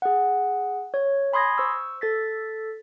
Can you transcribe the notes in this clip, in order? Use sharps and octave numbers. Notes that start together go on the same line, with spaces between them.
G#4 F#5
C#5
G#5 B5 C6 D#6 G#6 A#6
C5 C#6 E6
A4 A6 B6